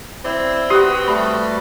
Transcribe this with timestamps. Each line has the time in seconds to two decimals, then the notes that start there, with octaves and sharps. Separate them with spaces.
0.25 C4 E4 D5
0.70 F#4 G4 B4 D#6
1.08 G3 A3 B5